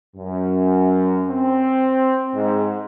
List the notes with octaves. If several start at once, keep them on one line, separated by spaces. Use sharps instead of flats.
F#2
C4
G#2